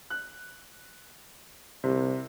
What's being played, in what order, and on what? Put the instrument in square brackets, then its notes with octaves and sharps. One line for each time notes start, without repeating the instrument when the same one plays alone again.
[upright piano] F#6
[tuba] C2 [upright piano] C3